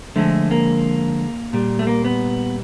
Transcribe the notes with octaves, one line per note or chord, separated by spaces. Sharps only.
D3 F3 G#3 A3
A#3
A#2 G3
A3
A#3
B3